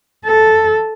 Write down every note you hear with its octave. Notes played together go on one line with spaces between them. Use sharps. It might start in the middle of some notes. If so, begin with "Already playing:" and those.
A4